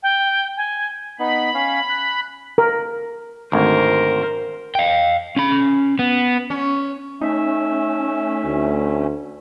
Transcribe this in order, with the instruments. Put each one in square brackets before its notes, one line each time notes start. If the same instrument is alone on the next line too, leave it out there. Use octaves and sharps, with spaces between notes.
[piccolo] G5
G#5
[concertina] B3 D#4 [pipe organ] B5
[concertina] C#4 C#5 F5
F#6
[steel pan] A#4
[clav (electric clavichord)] G#1 D2 [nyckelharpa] A#4 C5
[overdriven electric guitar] F5 G5
C#4 B5
B3
[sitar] C#4
[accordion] A3 C#4 [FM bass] D#4 [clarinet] E5
[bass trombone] D2